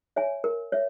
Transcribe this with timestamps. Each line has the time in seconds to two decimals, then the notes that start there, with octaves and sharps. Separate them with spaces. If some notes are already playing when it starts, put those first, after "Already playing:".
0.16 C#5 E5 G#5
0.44 A#4
0.72 C#5 E5